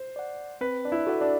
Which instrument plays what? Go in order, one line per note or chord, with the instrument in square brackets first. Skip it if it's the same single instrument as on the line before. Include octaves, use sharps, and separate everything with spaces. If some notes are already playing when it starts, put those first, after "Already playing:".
Already playing: [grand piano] C5
[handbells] D5 F#5
[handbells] C4 [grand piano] B4
[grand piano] D4
E4
[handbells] F#4 A4 D5 F#5
[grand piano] D4